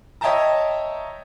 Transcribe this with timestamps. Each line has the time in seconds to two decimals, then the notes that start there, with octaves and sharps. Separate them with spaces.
0.21 C#5 D#5 E5 G5 A5 A#5